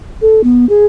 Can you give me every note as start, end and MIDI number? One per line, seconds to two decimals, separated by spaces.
0.22 0.42 69
0.44 0.68 59
0.69 0.86 68